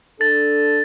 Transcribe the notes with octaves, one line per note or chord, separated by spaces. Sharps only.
D4 A4 A6